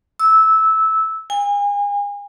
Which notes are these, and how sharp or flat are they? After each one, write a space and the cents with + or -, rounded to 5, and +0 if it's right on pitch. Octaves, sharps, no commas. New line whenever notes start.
E6 -15
G#5 -35